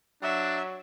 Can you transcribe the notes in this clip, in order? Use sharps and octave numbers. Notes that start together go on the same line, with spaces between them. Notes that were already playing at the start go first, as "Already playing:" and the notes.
F#3 D4 E5